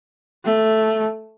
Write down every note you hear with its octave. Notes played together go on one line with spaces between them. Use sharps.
A3